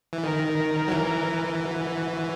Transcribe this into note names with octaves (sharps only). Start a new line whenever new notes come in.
E3
D#3 A#4
F#3
E3
F#4